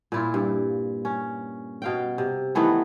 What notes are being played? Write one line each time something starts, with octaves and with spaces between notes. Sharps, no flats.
A#2 E4 F4
G2
C#4
B2 F5 G5
C3
D#3 E3 A3 B3